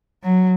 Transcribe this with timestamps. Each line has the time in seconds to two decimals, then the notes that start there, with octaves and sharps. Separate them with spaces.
0.24 F#3